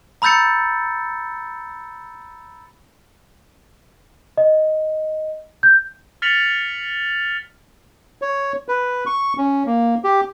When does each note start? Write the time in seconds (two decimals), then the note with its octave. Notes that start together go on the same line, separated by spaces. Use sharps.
0.22 A#5 B5 E6 G6 A6 C#7
4.38 D#5
5.63 G6
6.22 F6 A6 B6 C#7 F7 F#7
8.22 C#5
8.68 B4
9.06 C#6
9.38 C#4
9.66 A#3
10.04 G4